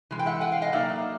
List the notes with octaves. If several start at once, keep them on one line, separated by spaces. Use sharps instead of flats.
E3 G#3
G5
E5 F#5
F#5 G#5
F5 G5
D#5 F5
F#3 A#3 D#4 D5 E5